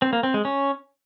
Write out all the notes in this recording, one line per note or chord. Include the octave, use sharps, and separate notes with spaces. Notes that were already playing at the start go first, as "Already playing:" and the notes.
C4
A#3
C4
G#3
C#4